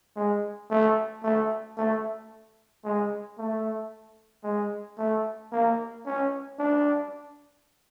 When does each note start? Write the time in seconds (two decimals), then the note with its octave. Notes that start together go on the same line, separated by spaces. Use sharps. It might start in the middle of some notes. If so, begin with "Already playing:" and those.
0.16 G#3
0.70 A3
1.23 A3
1.77 A3
2.84 G#3
3.38 A3
4.44 G#3
4.98 A3
5.52 A#3
6.06 C#4
6.59 D4